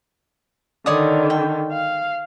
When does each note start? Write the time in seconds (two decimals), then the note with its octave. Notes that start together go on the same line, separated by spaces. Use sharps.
0.86 D3 D#3 C#5 D5 D#6
1.30 G5
1.72 F5